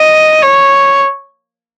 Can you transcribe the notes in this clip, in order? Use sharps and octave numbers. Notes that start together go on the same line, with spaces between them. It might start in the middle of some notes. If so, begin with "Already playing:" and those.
Already playing: D#5
C#5